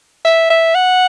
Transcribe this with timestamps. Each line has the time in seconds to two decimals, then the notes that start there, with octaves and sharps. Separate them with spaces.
0.25 E5
0.50 E5
0.75 F#5